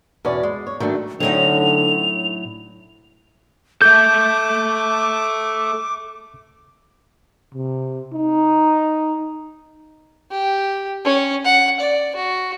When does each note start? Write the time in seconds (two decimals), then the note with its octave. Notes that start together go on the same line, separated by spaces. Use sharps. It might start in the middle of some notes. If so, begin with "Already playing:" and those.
0.25 E2 B2 C#4 C#5 D5
0.43 G#3
0.67 C#5
0.80 D#3 F#3 A3 D4
1.20 A2 D3 F#3 C4 C#4 D#4 F7
3.82 A4 E5 D6 G6
7.54 C3
8.13 D#4
10.31 G4
11.05 C#4
11.45 F#5
11.80 D5
12.16 F#4